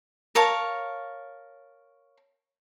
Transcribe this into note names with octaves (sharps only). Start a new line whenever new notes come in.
A#4 C#5 F5 A5